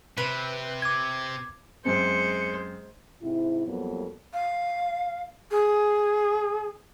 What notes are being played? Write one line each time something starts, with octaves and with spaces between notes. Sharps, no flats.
C3 B4
D6 G#6
F#2 G#3 C4 C5 C#7
G#2 C3 C4 E4
F2 F#3 G3 A#3 B3
F5
G#4